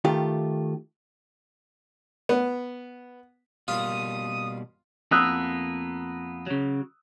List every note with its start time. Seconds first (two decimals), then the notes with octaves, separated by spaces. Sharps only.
0.05 D#3 A3 F4 G4
2.29 B3
3.68 B2 G3 A#3 F4 D#6
5.11 F2 A#3 B3 D#6 E6 F#6
6.46 C#3 F#3